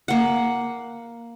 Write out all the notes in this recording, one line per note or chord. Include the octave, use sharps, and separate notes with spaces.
A#3 F#5